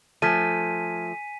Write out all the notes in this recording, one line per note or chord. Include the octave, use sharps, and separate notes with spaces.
F3 A3 G#5 A5 F6 G#6 B6 D#7